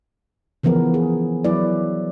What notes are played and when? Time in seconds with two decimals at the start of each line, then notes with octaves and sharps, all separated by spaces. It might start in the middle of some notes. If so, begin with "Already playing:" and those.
0.63 C#3 E3 F3 B3 A#4
0.94 G#4
1.44 E3 F#3 B3 E4 B4 D5